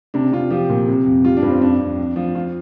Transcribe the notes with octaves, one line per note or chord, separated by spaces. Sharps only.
C3 D4
C3 F4
F3 G4
A#2
C3
F2
G3 F4
D4
G2
C4
F2 D4
F2
F2
F3
F3 F4